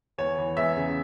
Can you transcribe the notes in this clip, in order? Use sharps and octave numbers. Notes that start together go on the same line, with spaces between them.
E2 C#5
E3
E2 E5
C#3